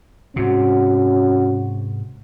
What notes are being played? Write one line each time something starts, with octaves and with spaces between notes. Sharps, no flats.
G#2 C3 C#4 F#4